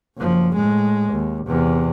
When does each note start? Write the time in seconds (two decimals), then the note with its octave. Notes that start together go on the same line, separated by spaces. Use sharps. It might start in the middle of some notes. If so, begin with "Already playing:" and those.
0.18 F#1 F3
0.55 A2 G#3
1.12 D#2
1.47 E2 C3